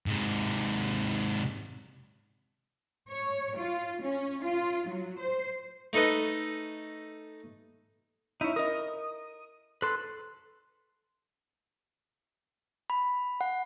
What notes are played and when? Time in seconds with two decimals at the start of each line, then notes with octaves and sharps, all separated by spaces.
0.06 G#2 C3
3.09 C#5
3.57 F4
4.02 C#4
4.44 F4
4.87 F#3
5.20 C5
5.93 A3 D#4 A4 B4 D#5
8.41 C#4 D#4 E4
8.56 A#4 D#5 D#6
9.82 A4 B4 C6
12.90 B5
13.41 F#5